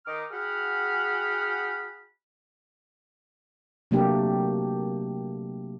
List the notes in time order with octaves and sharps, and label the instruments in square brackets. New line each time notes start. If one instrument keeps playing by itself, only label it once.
[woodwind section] D#3 D#4 D6 F6
F#4 G#4 F#5 G5 B5 F6
[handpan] C3 F#3 A3 A#3 D4 G4